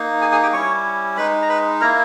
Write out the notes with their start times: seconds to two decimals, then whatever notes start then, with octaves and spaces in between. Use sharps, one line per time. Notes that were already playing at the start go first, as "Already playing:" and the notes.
Already playing: A#3 D#4
0.21 G#4 G#5
0.32 G#4 G#5
0.42 G4 G5
0.53 G3 C#4 E4 C#5 C#6
1.17 G#3 D#4 B4 B5
1.42 A#5
1.49 B4 B5
1.81 A#3 E4 A#4 A#5